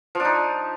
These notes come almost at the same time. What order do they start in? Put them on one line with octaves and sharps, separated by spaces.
F3 D4 D#4